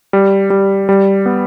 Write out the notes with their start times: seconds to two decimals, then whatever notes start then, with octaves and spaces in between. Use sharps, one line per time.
0.13 G3
0.50 G3
0.89 G3
1.26 B3